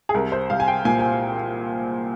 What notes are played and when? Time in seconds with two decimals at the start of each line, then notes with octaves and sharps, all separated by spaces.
0.09 G#4
0.14 C2 A#4
0.32 C5
0.50 C2 F5
0.60 G#5
0.68 G5
0.85 A#2 G#5
0.99 G#5